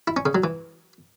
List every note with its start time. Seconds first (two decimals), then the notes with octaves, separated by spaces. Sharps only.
0.08 E4
0.17 C#4
0.26 C#3
0.35 F#3
0.44 E3